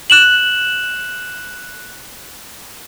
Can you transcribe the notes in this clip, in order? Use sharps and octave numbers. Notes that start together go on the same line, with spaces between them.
F#6 E7 F#7